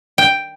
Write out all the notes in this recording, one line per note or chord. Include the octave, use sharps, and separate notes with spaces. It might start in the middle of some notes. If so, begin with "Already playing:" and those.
G5